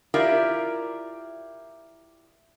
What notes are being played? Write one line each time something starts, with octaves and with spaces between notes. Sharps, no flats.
E4 F4 G4 A#4 D5